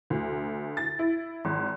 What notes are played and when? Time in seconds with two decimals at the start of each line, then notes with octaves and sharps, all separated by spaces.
0.10 D2
0.77 A6
0.99 E4
1.45 G#1